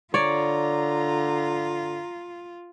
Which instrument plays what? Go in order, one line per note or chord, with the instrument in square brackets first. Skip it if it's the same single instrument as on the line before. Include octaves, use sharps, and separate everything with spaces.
[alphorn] D3 [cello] F4 [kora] C#5 D5 [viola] A#5